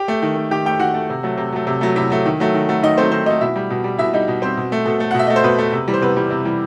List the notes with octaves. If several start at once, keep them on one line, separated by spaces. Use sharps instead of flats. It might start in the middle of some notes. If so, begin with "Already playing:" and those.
Already playing: G4 G5
A3
D#3
A3
D#3 G4 G5
A3 G4 G5
D#3 F#4 F#5
A3
C3
F#3 A3
C3
F#3 A3
C3
F#3 A3
C3 E4 E5
F#3 A3
D#3
F#3 A3
D#3
F#3 A3
D#3 D#4 D#5
F#3 A3 C4 C5
D#3 C4 C5
F#3 A3 D#4 D#5
B2 E4 E5
G3
B2
G3
B2 E4 E5
G3 D#4 D#5
B2
G3 C4 C5
B2
A3
B2 A4
A3
F#5
B2
E5
A3 D#5
C5
B2 B3 B4
A3
C3
E3 G3
C5
C3 B3 B4
E3 G3
C3
E3 G3